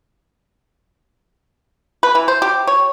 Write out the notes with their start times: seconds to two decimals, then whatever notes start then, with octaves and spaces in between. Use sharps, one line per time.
2.03 B4
2.15 E3
2.28 C5
2.42 G4
2.67 C#5